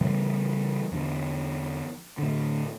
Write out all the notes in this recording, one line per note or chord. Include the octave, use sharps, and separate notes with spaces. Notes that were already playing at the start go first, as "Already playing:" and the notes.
C#3 E3 G3
E2 D3
A2 D3